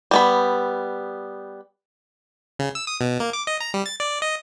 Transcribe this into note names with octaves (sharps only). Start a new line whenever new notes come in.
G3 B3 B5
C#3
E6
D#6
B2
A#3
D6
D#5
A#5
G3
A6
D5
D#5